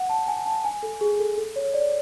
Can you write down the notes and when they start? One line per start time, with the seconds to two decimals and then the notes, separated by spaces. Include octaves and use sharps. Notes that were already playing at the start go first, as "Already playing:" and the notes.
Already playing: F#5
0.09 A5
0.28 G#5
0.46 A5
0.64 G#5
0.83 A4
1.01 G#4
1.13 G#4
1.19 A4
1.37 A4
1.56 C#5
1.74 D5